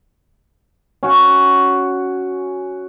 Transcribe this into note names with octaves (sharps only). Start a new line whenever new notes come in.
C#4 F#4